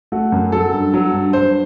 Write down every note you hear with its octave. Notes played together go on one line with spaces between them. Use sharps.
A3 F#4
F#2
F#3 A4
G2
F#3
G2
G2 C5